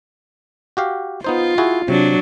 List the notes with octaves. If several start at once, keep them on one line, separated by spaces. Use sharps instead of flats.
F#4 G4 F5
B3 D#4 F4 C5
E4 F#4 G#4
C3 F#3 D4